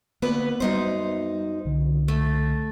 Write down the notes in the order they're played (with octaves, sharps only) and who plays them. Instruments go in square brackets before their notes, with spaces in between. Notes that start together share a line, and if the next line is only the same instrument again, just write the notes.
[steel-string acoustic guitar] D2 B3 B4 [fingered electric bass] A#3
[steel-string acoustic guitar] F#2 D#4 C5 [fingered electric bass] G3 B3
[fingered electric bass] C2 D3
[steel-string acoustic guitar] A3